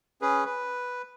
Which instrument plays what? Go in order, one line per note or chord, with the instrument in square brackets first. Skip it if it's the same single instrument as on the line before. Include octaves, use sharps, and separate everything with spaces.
[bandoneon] C#4 G#4 B4
B4